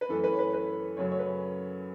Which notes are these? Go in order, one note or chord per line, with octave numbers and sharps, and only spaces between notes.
B4
F#2 E3 A3 A4
B4
C#5
B4
B4
F#2 C#3 F#3 A3 C#5
C#5
B4